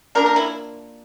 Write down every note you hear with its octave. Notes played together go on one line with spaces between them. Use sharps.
F3 A#3 D4 A#4
A#4
E4